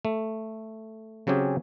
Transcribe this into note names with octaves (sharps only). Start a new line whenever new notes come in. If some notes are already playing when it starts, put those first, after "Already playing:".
A3
C#3 F#3 C4 C#4 G4 G#4